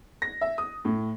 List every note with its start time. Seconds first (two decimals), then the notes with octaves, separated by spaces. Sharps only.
0.22 A#6
0.41 E5
0.58 D#6
0.85 A2